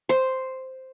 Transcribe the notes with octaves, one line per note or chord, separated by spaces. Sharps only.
C5